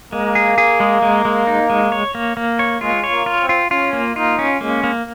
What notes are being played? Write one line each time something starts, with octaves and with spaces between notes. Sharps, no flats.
G#3 A#3
G#4
G#4
G#3
G#3
G#3
D#4
G#3
C#5
A#3
A#3
C#5
G#3 F4
C#5
A#3
F4
C4
F4
C#4 F4
A#3
D#4 F4
C#4
G#3 A#3
A#3